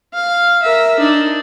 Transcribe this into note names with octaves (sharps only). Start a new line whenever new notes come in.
F5
A#4 E5
D4 D#4